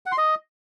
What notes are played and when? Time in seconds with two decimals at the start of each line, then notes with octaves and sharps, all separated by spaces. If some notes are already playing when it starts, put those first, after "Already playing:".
0.06 F#5
0.12 C6
0.18 D#5